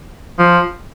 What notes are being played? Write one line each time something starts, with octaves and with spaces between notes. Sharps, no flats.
F3